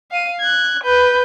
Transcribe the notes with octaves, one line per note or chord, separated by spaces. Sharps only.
F5 D#7
F#6 G#6
B4 G6